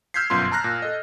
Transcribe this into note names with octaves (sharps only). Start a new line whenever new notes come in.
E6 F6 G6 G#6 B6 C7
G1 F#2 B2 F4 C6
A5 A#5 F6 F#6 A#6
A#2
A4 D#5